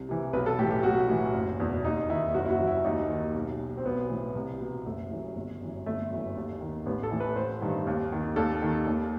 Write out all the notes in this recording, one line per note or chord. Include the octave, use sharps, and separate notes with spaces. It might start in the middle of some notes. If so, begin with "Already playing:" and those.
Already playing: C2
C3 E3
B1 B4
A4
A2 E3 G4
G4
B1 F#4
A2 E3
F#1
E2 B2
D#2 D#4
D#3 E4
F#1 F#4
E4
F#4
F#2 E3
E4
D#2 D#4
D#3
B1
B2
C4
B1 B3
A2 E3
C2
B2
F#1 A3
F#2 E3
G1
F#2 E3
G1 A3
F#2 E3
D#2
D#3
A1 B3
A4
A2 E3
B4
A1 C5
G2 D#3
D#2
D#3
D#2 A4
D#3
D#2